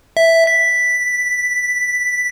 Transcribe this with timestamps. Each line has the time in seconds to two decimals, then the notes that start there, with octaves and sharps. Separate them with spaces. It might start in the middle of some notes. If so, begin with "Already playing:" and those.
0.17 E5
0.47 B6